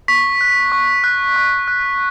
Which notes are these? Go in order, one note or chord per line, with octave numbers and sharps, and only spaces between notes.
C#6 B6
F#6
C#6
F#6
C#6
F#6